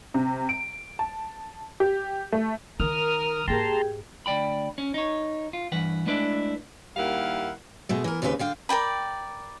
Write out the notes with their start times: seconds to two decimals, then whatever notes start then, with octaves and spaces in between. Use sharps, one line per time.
0.14 C3
0.49 D7
0.99 A5
1.80 G4
2.32 A3
2.80 D#3 A#4 D#6 F6
3.48 G#2 A#3 G4 G#4 G5 A5 A#5 C6
4.26 D2 F#3 D5 G5 B5
4.78 C#4
4.94 D#4 C#5
5.53 F4
5.72 G2 E3 B4 F#5
6.06 G#3 A3 D4 E4 B4 D5
6.97 D#2 G3 E4 A#4 F5 F#5
7.89 B2 G#3 A3
8.04 E3 A#4
8.22 D#2 C#3 C4 D4 G4 B4
8.39 D3 F5 G5
8.69 A#4 D5 G5 B5